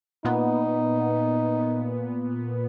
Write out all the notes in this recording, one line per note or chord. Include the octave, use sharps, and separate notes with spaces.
A#2 B3 D#4